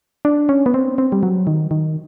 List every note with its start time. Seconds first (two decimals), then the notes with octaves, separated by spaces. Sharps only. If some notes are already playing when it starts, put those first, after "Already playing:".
0.25 D4
0.49 C#4
0.66 B3
0.74 C4
0.98 C4
1.12 G3
1.23 F#3
1.47 D#3
1.71 D#3